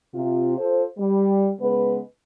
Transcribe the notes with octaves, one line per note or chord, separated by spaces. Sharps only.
C3 F4
F4 A4 C5
G3
C#3 G#3 B3 B4